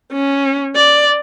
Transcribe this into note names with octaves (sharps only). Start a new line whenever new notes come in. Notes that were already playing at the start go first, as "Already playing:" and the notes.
C#4
D5